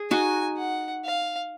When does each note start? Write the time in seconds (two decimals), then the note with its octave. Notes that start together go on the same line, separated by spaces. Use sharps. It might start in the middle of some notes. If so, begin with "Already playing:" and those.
Already playing: G#4
0.11 D#4 F#4 G#5
0.57 F#5
1.05 F5